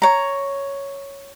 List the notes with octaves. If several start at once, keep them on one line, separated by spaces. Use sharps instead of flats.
C#5 A#5